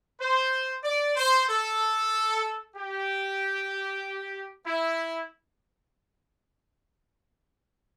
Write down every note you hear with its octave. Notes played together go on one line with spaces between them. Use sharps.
C5
D5
C5
A4
G4
E4